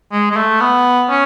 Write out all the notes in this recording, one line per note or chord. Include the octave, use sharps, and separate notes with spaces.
G#3
G#3
A3
B3
C#4